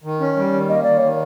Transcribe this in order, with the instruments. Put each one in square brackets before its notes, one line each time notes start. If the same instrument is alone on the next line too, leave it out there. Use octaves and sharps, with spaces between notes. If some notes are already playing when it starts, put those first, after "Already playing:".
[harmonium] D#3
C#4
G3
D#3
[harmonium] A#3 [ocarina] D#5
[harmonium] D#3 [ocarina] D5
[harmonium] D#3 [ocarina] C#5